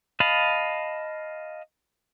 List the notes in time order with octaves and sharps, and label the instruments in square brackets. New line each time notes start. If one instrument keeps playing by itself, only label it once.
[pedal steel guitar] D#5 F5 A5 B5